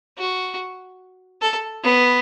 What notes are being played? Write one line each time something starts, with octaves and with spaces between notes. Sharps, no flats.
F#4
A4
B3